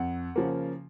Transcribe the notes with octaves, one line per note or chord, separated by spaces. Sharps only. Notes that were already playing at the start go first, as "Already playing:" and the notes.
Already playing: F2 F#5
C#3 F3 A#3